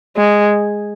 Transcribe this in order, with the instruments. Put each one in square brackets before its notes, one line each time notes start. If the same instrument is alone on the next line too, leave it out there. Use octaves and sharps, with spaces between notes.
[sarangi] G#3